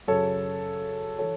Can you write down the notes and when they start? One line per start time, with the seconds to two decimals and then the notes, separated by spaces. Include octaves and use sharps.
0.08 F#2 C#3 F#3 A4 C#5
1.18 E3 A4 C#5